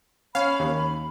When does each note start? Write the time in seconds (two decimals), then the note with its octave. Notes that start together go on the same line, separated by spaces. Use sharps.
0.35 C#4 F5 B5
0.60 D#2